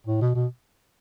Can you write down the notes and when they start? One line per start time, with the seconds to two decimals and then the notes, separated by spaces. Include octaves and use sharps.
0.07 A2
0.21 B2
0.35 B2